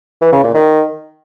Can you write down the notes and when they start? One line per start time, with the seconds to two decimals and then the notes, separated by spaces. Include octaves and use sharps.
0.21 E3
0.32 C#3
0.43 A#2
0.54 D#3